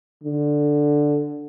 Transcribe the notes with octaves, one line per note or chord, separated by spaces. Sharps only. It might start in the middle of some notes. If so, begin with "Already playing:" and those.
D3